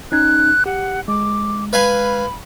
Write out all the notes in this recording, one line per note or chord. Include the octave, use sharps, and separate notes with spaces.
C#4 D#4 F#6 G#6
G4 F#5
G#3 D6
B4 F5 G#5 B5